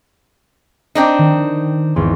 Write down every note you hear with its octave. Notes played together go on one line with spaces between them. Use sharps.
C4 D4 D#4
D#3
G#1 E2 C6